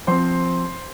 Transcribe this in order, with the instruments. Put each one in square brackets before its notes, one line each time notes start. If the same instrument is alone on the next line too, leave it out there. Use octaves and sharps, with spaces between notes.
[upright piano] F3 C4 C5 C6